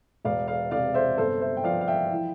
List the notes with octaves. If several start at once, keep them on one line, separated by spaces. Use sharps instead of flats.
E1 D5 F5
D5 F5
C3 D5 F5
C5 E5
G1 A4 C5
C5 E5
G5
F3 D5 F5
F5
E5 G5
E3